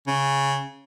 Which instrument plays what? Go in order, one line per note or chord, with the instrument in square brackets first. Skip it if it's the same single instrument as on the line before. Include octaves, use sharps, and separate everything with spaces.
[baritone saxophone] C#3